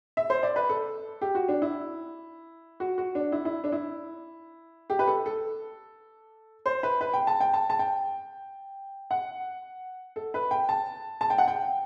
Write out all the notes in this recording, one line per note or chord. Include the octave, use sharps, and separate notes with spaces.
E5
C5
D5
B4
A4
G4
F#4
D4
E4
F#4
F#4
D4
E4
E4
D4
E4
G4
B4
A4
A4
C5
B4
B4
G5
A5
G5
A5
A5
G5
F#5
A4
B4
G5
A5
A5
G5
F#5
G5